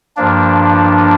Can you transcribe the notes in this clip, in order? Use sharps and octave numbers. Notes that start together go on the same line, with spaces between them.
G2 F3 A#3 D4